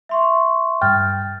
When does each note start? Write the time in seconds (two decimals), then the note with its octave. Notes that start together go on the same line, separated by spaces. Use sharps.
0.09 E5 C6 C#6
0.82 G2 G5 F6 A6